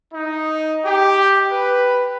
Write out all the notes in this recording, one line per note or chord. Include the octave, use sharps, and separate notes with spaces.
D#4
G4
B4